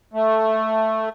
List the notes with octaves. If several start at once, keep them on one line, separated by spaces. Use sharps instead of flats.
A3